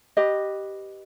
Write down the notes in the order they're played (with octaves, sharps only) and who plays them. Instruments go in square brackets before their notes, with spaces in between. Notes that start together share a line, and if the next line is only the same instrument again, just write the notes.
[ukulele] G4 B4 D#5